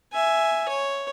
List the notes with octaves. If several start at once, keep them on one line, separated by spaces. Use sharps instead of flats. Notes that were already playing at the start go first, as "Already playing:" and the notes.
E5 G#5
C#5